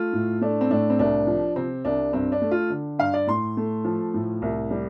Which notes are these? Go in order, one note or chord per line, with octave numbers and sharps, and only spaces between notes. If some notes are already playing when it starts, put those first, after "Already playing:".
Already playing: A3 F4
A2
A3 D4
C4
A2 D4
C4
C2 D4
F3
C3 C4
C2 D4
G2 C4
D4
A3
F4
D3
G2 F5
D5
A2 C6
A3
F3
A2
C2
G3